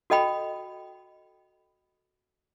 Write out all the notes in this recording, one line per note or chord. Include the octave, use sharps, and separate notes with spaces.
F#4 A4 D#5 G5 B5